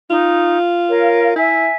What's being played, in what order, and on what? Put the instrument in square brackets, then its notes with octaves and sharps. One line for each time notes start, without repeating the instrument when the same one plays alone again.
[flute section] D#4 [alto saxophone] F4
[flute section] A#4 C#5 F5
[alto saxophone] E4 [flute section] E5 G#5